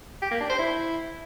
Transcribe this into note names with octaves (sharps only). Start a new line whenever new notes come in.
G4
A#3
D4
C5
E4